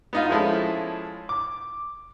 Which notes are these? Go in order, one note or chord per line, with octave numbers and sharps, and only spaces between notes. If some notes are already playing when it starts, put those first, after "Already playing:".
B3 D#4 F4
F3 G#3 C#4 E4 A4
D6